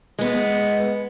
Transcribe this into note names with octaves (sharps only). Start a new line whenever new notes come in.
G#3 B3